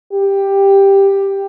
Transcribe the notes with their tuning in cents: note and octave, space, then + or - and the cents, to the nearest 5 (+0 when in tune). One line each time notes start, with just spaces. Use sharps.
G4 +5